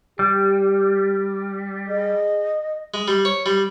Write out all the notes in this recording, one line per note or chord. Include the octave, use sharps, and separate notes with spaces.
G3 G4
G#4 D#5
G#3
G3
C#5
G3